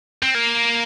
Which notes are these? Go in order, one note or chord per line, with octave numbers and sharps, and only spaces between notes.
C4
A#3